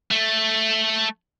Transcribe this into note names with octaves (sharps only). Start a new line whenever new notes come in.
A3